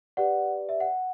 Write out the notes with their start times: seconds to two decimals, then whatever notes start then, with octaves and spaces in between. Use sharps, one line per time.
0.17 G4 B4 D5 F#5
0.69 E5
0.80 F#5